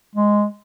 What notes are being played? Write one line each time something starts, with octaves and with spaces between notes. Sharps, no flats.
G#3